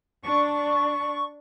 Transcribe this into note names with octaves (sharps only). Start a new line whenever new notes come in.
D4 C#6